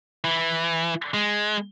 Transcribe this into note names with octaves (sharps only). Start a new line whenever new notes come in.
E3
G#3